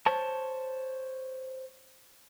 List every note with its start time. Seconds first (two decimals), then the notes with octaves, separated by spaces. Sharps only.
0.06 C5 C#5 A5